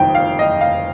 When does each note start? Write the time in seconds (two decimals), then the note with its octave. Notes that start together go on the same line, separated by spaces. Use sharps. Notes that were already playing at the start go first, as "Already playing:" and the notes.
Already playing: F1 F2 D#3 G5
0.15 F5
0.39 D#5
0.61 F5